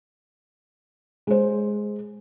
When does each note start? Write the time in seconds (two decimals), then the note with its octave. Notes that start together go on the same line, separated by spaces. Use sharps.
1.27 G#3 C5